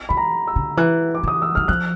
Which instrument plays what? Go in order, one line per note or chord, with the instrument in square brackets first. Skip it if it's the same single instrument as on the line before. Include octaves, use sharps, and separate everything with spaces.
[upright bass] E3 [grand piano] B5
[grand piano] A#5
E6
[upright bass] D3
[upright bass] E3 [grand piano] F#6
[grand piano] D6
[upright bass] E3 [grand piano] D#6
[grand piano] E6
[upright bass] E3 [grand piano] F6
[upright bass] F3 [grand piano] F#6